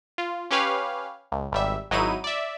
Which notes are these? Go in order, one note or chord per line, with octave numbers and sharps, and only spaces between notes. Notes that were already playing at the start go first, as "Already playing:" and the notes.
F4
C#4 G4 B4 C#5 F5
C#2
G#1 G3 E5
G#1 F#3 D#4 E4 D#7
D5 E5